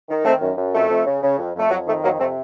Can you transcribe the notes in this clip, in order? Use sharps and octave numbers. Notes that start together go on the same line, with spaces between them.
D#3
D#3 A3 C4
F#2
F#2
F2 A3
F2
C#3
C#3
F2
F2 A3
F2 F#3
D#3 A3
F2 F#3 A#3
C3 A3 C4